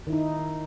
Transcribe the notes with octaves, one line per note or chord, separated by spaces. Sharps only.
D#3 D#4 E4